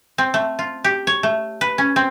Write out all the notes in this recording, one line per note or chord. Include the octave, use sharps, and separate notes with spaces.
C4
A3
F4
G4
C#5
A3
B4
C#4
C4